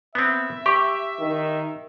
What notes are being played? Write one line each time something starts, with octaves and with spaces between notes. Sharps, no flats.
B3 C4 E5
G4 C#6 D6
D#3